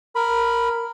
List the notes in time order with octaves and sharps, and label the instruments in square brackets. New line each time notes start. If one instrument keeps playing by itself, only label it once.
[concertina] A#4 B5